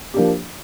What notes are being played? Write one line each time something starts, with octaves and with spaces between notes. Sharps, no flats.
F3 A#3 D4 G4